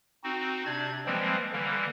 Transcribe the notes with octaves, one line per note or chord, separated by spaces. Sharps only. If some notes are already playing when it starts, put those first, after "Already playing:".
C4 D#4 F#4
C3 D4 D5 G#6
E3 F3 G3 G#3 A#3 C4
D3 E3 G3 A#3